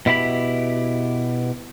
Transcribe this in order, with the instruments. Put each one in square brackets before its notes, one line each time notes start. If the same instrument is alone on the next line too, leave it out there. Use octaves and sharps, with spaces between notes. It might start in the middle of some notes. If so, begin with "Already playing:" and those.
[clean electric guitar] B2 E4 G4 B5